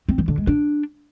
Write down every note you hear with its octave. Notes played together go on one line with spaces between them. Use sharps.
C4
E3
D3
G#3
D4